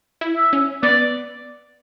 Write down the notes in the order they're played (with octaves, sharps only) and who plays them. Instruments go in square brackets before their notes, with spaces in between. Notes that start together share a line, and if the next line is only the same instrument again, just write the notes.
[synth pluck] E4
[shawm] E5
[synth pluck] C#4
[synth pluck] B3 [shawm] D5